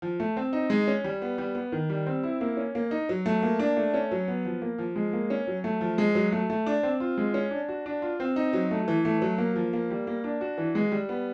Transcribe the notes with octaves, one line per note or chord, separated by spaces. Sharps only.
F3
A3
C4
D#4
G#3
C#4
G3
B3
G3
B3
D#3
G3
C4
E4
A#3
C#4
A#3
D#4
F#3
A3
A#3
D4
A3
C#4
F#3
B3
F3
A#3
F3
G#3
A#3
C#4
F#3
A3
F3
G#3
F#3
A3
A3
D4
C4
F4
G#3
C#4
D4
F#4
D4
F4
C4
D#4
F#3
A3
E3
A3
F#3
A#3
F3
A#3
G3
A#3
D4
F#4
E3
G#3
G3
B3